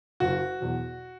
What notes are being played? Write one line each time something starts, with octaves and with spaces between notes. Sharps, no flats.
F#1 F#4
E2 B2 F#3